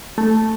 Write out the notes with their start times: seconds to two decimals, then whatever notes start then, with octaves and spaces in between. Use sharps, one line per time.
0.18 A3